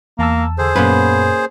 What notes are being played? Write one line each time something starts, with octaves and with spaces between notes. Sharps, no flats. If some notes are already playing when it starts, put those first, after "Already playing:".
E2 A#3 A5 E6
D3 G#4 C5
F#2 A#2 A#3 B3 C#4 B4